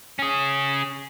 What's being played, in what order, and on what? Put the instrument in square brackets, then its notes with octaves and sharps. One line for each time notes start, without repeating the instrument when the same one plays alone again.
[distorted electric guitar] C#4 G#4